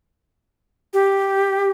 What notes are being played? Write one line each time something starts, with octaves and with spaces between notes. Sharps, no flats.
G4